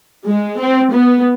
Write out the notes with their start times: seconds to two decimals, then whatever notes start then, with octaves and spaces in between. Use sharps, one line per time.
0.25 G#3
0.60 C4
0.92 B3